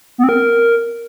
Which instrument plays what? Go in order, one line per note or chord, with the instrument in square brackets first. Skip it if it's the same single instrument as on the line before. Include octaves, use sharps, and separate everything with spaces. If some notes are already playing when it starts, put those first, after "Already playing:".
[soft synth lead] B3
C4
A#4